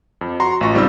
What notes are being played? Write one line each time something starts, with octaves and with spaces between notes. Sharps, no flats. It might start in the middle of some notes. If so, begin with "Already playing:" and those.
F2
F#4 A#5 C6
A1 F4 C#6 A#6
C#2 G3 C4 D#4 E6